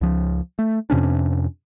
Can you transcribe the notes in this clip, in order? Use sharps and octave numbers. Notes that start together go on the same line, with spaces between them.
C#2 F3
A3
F2 C3 C#4 D4